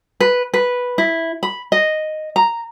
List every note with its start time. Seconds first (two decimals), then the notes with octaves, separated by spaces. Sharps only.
0.20 B4
0.54 B4
0.98 E4
1.43 B5
1.72 D#5
2.36 A#5